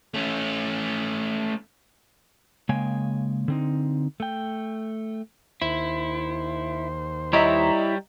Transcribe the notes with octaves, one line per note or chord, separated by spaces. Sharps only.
A3 C#4
C#3 G#3 A#3 C#5 G5 G#5
D3 C4 D#4
A3 G5
D#2 E4 C5
G3 E4 C#5 D#5 E5 A#5